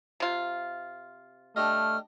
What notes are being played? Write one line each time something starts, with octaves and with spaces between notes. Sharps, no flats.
C3 F4
A3 D4 G4 D#5 F6